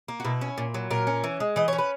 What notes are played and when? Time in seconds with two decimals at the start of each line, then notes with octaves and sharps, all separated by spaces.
0.08 A#3
0.20 F#4
0.25 B2 E4
0.41 C#4
0.58 A#2
0.74 F#3
0.90 A#2 A#4
1.07 C#4
1.24 E3
1.40 G#3
1.56 E3 D#5
1.68 C#4 C#5
1.78 B4